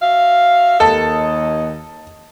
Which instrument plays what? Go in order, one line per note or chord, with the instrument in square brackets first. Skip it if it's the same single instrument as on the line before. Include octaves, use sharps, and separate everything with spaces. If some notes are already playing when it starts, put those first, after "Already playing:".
[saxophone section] F#4 E5 F5
[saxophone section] D#2 D#5 [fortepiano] A4